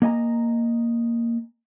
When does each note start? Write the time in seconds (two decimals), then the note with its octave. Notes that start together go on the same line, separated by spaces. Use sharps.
0.02 A#3 D#5 G#5 A#5